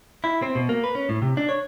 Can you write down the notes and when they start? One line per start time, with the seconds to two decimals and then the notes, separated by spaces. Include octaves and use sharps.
0.24 E4
0.42 C4
0.55 B2
0.69 A#3
0.84 B4
0.95 C#4
1.09 A2
1.22 C3
1.37 D4
1.49 C#5